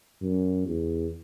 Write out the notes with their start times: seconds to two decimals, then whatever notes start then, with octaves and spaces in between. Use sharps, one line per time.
0.22 F#2
0.67 E2